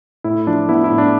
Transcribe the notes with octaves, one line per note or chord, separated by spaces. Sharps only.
A2 E4
F3 D4
B3 E4
E4
A2
D4